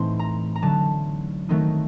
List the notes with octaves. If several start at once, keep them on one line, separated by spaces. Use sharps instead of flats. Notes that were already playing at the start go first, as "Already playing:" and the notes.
Already playing: A2 E3 A3 C4 D#4 C6
A#5
A#5
D3 F#3 A3 A5
D#3 F#3 A3 C4 D#4